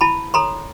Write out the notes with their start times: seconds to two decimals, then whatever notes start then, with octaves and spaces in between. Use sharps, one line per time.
0.01 E4 A5 B5
0.34 A4 C#5 A#5 C6